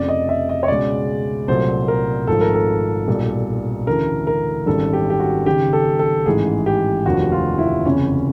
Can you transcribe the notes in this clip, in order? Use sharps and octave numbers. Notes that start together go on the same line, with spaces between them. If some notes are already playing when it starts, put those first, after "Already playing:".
Already playing: F1 F2 C#3 D5
D#5
E5
D#5
C#5
C#2 B2 G#3 D5
C2 A#2 F#3 A3 C5
A#4
G#1 G#2 F3 A3 A4
A#4
A4
B1 A#2 G3
D2 C#3 E3 A3 A#4
A#4
G#1 F#2 D#3 G3 A4
G4
G4
F#4
F#1 F#2 D#3 G4
A4
A4
A1 G#2 E3 G#4
G4
F1 D#2 D3 F3 F#4
F4
E4
F#1 E2 C3 C#4